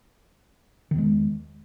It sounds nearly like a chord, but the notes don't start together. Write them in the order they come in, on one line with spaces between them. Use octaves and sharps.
D#3 E2 G#3